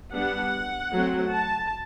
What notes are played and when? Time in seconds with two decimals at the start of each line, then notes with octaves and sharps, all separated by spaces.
0.13 G3 B3 D4 F#5
0.91 F#3 A3 C4
1.29 A5